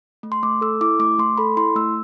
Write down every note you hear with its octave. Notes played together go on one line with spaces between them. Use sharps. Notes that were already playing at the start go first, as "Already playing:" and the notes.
A3
C6
A3 D6
A4 E6
E4 D6
A3 D6
A3 C6
A4 B5
E4 C6
A3 E6